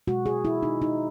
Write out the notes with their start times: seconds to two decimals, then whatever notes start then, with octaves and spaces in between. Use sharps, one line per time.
0.07 B2 G#3 F#4
0.26 G#4
0.45 E4
0.63 D#4
0.82 D#4